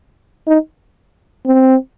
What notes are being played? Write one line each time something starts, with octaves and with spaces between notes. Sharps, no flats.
D#4
C4